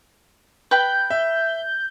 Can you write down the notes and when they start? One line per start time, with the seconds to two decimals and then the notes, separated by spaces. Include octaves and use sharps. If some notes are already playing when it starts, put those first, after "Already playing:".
0.71 B4 G5 B5 G6
1.10 E5